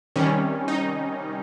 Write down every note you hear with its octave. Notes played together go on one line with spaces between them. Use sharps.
C3 D#3 G3 C#4
D#4